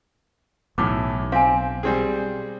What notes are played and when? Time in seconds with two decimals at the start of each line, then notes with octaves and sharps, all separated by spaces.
0.78 B1 E2 A2 D6
1.32 C4 F5 G#5
1.83 G3 C4 G#4